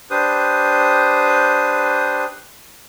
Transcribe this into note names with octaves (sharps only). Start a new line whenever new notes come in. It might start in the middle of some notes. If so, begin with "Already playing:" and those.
D4 G4 B4 C5 D#6